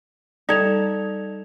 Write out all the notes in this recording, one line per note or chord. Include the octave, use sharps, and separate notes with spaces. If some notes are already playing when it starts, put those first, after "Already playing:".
G3 D#4 A4 D5 G#6 F7